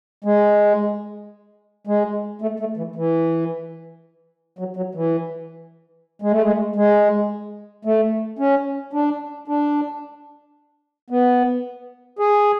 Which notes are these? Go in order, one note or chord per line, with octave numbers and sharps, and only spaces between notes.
G#3
G#3
A3
A3
E3
E3
F#3
F#3
E3
G#3
A3
G#3
G#3
A3
C#4
D4
D4
B3
G#4